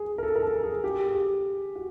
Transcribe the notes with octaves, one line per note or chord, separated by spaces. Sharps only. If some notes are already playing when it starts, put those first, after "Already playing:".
Already playing: G#4
A#4
A4
A#4
A4
G#4
G4
G#4
G4
F#4